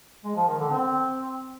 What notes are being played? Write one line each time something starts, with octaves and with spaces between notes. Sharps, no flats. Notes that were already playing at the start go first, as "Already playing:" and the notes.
G#3
F3
D#3
D3
C4